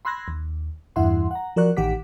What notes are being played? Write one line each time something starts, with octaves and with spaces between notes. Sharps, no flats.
B5 C6 E6 F#6 G#6 A#6
D#2
E2 G2 E4 E5 F#5 C6
F#5 A#5
F3 F#4 A#4 D5 C#6 F#6
A1 D#3 G4 F#5 D6 B6